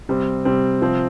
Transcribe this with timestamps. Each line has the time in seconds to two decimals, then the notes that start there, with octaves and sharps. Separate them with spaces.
0.09 C3 G3 C4
0.45 C3 G3 C4
0.82 C3 F3 C4